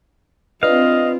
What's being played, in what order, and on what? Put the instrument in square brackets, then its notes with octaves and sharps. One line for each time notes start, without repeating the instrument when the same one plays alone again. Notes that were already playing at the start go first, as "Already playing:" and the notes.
[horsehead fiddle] C4 F4 [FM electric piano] D4 B4 [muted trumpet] D#5 [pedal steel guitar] F5